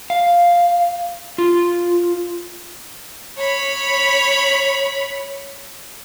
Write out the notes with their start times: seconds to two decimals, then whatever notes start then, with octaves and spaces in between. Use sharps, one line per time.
0.10 F5
1.38 F4
3.38 C#5 B5